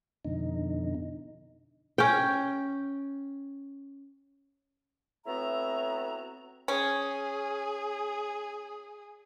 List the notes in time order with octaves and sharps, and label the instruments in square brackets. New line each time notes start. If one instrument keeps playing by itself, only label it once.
[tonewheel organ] F2 B2 D3 D#4
[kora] C#4 G5
[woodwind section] A2 B3 C4 F#4 E5 A#5
[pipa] C#4 [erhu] G#4